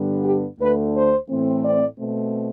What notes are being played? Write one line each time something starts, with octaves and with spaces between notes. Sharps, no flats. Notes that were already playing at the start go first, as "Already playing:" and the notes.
Already playing: G2 D3 G3 B3 D4
G4
D2 D3 A3 B4
C5
A2 E3 A3 C4
D5
B2 A3 C4